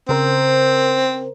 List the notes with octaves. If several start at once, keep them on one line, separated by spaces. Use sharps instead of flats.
C#3 C4 A#4 C5